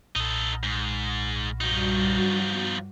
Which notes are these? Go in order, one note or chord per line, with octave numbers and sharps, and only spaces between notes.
B1 A#2 D#4 A4
G#2
G2 F3 G3 D#4 F#4
B3